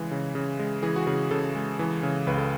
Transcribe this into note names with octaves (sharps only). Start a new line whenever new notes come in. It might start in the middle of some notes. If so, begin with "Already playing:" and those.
Already playing: C#3 E3 G#3
C#3
C#3
G#3
E3 G#4
F#4
C#3 G#4
C#3 A4
G#3
E3
C#3
C#2 B4
A4